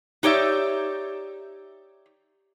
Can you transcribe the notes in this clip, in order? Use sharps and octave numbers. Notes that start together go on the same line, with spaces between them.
D#4 G4 C#5 D5 E5